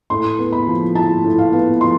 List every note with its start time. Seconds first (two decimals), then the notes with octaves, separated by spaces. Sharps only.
0.10 A2 C6
0.39 B3
0.52 B5
0.67 F3
0.95 E4 A5
1.24 A2
1.38 F5
1.53 B3
1.81 F3 C6